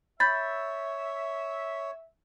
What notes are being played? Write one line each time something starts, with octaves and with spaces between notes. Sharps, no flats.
C#5 E5 B5 G6 A6